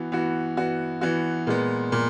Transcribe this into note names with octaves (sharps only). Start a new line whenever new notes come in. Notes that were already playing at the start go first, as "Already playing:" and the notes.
Already playing: E3 B3 F#4
E3 B3 F#4
E3 B3 F#4
E3 B3 F#4
A#2 G#3 B3
A#2